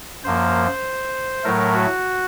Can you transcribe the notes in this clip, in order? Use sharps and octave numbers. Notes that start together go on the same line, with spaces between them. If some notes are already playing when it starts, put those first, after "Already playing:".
F#2 F3 A#3 C5
A2 F#3 A3 A#4
F#4